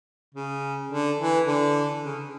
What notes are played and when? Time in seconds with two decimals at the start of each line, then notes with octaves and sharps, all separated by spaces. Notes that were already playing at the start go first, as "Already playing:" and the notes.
0.34 C#3
0.91 D3
1.20 E3
1.47 D3
2.04 C#3